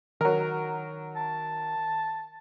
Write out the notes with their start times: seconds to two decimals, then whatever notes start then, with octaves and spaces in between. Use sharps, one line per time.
0.21 D#3 F#3 A#4
1.16 A5